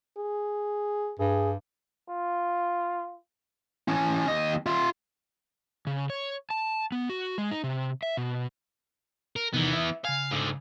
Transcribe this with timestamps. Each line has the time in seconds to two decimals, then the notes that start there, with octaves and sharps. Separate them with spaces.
0.18 G#4
1.20 G2 G#4
2.09 F4
3.88 E3 C#4
4.28 D#2 D#5
4.66 F4 E5
5.87 C#3
6.10 C#5
6.50 A5
6.92 B3
7.09 F#4
7.38 G#3
7.51 D#4
7.64 C3
8.03 E5
8.17 B2
9.36 A#4
9.53 C3 D#3 E3 B3 D#4
9.73 E5
10.05 C#3 F5 G#5
10.31 G#2 D3